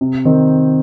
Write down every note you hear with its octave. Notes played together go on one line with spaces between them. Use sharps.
C3
D#3 C4